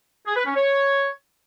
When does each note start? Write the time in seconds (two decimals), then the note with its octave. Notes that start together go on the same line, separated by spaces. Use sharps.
0.27 G#4
0.37 B4
0.46 C#4
0.56 C#5